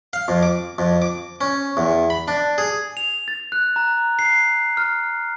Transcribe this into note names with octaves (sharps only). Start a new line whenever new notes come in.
F5
F2
D6
F2
D6
C#4
E2
B5
D4
G#4
F7
A6
F#6
A#5
C7
F6